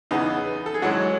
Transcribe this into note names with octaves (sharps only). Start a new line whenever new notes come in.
E2 C#3 E3 B3 D#4
A4
G#4
G#2 E3 F#3 G#3 C#4 F#4